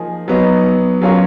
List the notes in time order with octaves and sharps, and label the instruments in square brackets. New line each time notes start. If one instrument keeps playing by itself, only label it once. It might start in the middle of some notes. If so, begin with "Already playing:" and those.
Already playing: [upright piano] F3 A#3 D#4 G#4
F#3 B3 D#4
F#3 C#4 F4 A#4